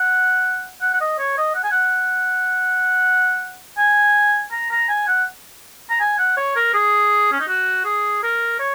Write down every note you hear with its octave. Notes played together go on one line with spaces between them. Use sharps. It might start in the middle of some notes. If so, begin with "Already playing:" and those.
Already playing: F#5
F#5
F#5
D#5
C#5
D#5
F#5
G#5
F#5
G#5
A#5
A#5
G#5
F#5
A#5
G#5
F#5
C#5
A#4
G#4
C#4
D#4
F#4
G#4
A#4
C#5